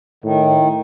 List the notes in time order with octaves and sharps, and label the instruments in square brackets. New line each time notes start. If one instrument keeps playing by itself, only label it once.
[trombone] A2 [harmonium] D#3